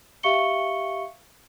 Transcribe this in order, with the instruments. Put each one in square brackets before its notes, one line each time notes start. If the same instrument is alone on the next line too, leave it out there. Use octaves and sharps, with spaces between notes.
[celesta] G4 E5 F5 C#6 C#7 G7